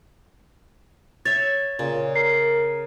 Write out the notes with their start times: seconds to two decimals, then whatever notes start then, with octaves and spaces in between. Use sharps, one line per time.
1.25 C#5 E5 A6
1.79 A#2 C#3
2.16 A#4 C7